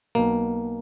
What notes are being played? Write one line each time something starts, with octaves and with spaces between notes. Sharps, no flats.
B1 B2 A#3